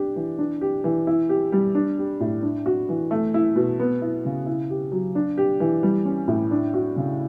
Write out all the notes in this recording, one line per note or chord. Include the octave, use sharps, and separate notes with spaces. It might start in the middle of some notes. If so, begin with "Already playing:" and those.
Already playing: D4 G4
E3
D4
G4
E3
E4
G4
G3
D4
G4
A2
D4
F#4
E3
A3
E4
B2
B3
E4
C#3
E4
G4
F#3
D4
G4
E3
G3
C#4
A2
D4
F#4
C#3